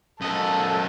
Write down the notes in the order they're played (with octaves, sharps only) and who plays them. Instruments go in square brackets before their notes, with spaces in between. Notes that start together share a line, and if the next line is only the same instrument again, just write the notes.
[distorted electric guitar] F#2 D#5 [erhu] A4